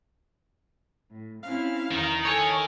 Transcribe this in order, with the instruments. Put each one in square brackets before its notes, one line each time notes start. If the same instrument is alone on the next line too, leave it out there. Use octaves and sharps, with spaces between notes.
[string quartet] A2
[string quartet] C4 C#4 E4 [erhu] F5
[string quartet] E2 A#5 [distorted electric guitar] D#3 D#4
[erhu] A4 [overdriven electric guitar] C#5 [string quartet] G#5